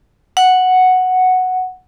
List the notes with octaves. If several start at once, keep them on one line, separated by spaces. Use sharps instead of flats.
F#5